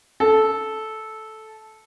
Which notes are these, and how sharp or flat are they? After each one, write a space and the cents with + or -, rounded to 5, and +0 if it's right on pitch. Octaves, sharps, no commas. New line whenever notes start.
A4 -10